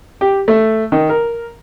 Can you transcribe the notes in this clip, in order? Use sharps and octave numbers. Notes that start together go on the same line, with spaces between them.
G4
A3
D#3
A#4